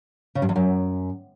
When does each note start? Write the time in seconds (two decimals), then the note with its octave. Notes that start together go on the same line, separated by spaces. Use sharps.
0.35 C#3
0.42 G2
0.49 E2
0.56 F#2